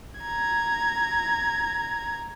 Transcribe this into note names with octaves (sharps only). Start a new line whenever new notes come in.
A#5 G#6